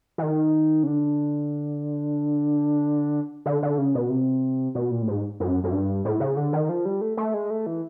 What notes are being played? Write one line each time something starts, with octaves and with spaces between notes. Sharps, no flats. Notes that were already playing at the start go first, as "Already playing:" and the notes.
E3
D#3
C#3
D3
D3
D3
C#3
B2
C3
B2
A#2
A2
G#2
F#2
F#2
G2
A2
C#3
D3
D#3
F3
G3
A3
A3
G#3
A3
E3